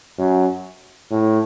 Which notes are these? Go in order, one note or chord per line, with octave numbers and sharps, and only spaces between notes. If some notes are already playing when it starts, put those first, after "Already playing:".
F#2
A2